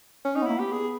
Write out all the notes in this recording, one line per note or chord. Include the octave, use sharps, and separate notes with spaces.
C#4
C#4 D#4
B3
A#3 E4
B3 G4
G#4